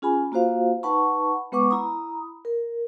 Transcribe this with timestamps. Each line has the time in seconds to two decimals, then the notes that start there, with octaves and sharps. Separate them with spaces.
0.02 C#4 F4 G#4 G#5 B5
0.32 A#3 F4 F#4 C5 F5
0.83 D#4 B4 F#5 A5 B5 C#6
1.52 G#3 B3 B4 F#5 C#6 D6
1.71 E4 A#5 B5 D#6
2.45 A#4